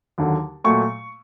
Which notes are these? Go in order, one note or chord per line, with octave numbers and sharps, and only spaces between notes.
D#2 D3 F#3
A#2 F#3 A3 C#6